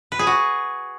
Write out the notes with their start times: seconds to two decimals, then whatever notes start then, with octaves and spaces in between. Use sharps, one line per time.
0.12 B4
0.19 G#4
0.27 F#4